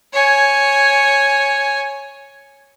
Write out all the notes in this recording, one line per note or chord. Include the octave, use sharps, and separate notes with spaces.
C#5 G#5